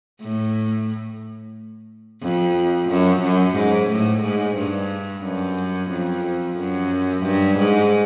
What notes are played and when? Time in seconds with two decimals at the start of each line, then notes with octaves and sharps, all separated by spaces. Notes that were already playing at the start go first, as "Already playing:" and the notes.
0.22 A2
2.22 F2
2.89 F#2
3.22 F#2
3.55 G#2
3.90 A2
4.23 G#2
4.56 G2
5.24 F#2
5.91 F2
6.58 F#2
7.24 G2
7.58 G#2